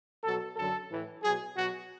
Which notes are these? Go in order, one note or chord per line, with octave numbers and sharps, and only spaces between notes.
B2 F#3 A4
F#2 D3 F#3 A4
A2 E3
B2 F#3 G#4
B2 F#3 F#4